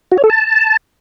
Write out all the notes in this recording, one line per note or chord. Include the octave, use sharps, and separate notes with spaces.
F#4
C#5
A4
A5